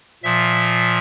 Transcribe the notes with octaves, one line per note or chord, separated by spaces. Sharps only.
A#2 F3 E5